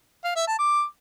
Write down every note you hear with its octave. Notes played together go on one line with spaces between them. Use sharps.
F5
E5
A5
D6